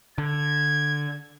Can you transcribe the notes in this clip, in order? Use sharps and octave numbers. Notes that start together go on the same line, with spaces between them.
D3 G#6